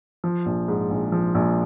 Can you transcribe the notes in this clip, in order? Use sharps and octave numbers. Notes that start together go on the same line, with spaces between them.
F3
A#1
G#2
A#1
F3
A#1